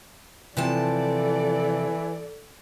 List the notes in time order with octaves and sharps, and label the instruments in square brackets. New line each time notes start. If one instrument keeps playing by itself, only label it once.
[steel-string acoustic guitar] C3 F3 A5 [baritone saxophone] E3 [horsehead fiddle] A4 D5